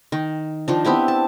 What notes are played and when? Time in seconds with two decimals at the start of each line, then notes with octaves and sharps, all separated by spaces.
0.12 D#3
0.68 D#3 F3 D4
0.85 B3 C4 E4 G4
1.08 A5